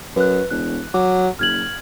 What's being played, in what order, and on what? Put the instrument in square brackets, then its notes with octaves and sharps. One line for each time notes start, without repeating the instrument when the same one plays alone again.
[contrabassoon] F#2 [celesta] B4 F#6
[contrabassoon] E1 [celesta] F#6
[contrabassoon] F#3 [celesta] D6
[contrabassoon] F#1 [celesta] F6 G#6 F#7